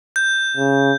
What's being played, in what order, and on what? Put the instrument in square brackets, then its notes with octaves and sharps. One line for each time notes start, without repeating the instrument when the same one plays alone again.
[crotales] G6
[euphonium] C#3